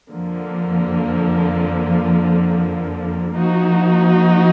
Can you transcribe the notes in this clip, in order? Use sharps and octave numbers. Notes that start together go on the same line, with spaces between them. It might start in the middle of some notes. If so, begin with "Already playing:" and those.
F2 D3 F3 A#3
F3 A#3 D#4 F#4